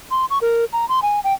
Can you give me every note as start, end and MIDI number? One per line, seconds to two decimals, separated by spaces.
0.11 0.25 84
0.30 0.38 85
0.42 0.65 70
0.73 0.88 82
0.89 1.00 84
1.02 1.20 80
1.24 1.33 79